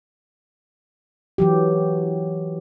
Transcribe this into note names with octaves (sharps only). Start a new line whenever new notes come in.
E3 F#3 G4